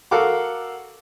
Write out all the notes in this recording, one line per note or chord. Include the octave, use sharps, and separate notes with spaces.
F#4 A4 A#4 F5 F#5 D6